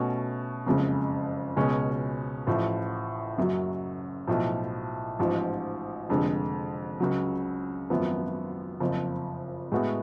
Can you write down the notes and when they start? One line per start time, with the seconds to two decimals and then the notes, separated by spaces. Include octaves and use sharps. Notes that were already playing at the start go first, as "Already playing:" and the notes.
Already playing: B2 A3 C#4 F#4
0.66 F#1 F2 C#3 G#3
1.56 C#2 B2 G#3 C#4
2.47 A1 A2 F3
3.38 F#1 F#2 C#3 F#3
4.28 B1 A2 F3
5.19 A1 G#2 F3
6.09 F1 F2 D3 G#3
7.00 C#2 C#3 F#3
7.90 G#1 F#2 F3 B3
8.80 F#1 F2 F3
9.72 A2 G#3 B3 F#4